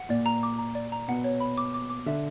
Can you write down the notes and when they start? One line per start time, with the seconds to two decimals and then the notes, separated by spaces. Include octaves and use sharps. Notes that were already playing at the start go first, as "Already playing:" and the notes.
Already playing: F#5
0.09 A#2 D5
0.26 A#5
0.43 D6
0.58 A#5
0.75 D5
0.92 A#5
1.08 B2 F#5
1.24 C#5
1.40 B5
1.58 D6
1.74 D6
1.90 D6
2.06 D3 E5